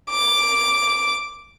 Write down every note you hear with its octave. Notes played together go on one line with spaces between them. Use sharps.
D6